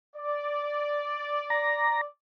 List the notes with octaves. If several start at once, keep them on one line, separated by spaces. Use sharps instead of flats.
D5
A#5